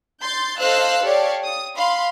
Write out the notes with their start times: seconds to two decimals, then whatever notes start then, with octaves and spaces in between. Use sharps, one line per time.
0.22 C6 G6 A6
0.59 A4 C5 D#5 F5 E6 F#6
1.02 G4 A4 C#5 D5 F5
1.44 D#6
1.76 F5 B5 C6